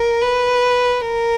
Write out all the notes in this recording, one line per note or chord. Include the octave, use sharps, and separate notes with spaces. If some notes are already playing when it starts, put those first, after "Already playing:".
Already playing: A#4
B4
A#4